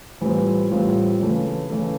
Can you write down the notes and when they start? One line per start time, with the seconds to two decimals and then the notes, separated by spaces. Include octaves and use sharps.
0.21 A2 E3 G3 C4 F4
0.71 A2 E3 G3 C4 F4
1.20 C#3 E3 A3
1.70 C#3 E3 A3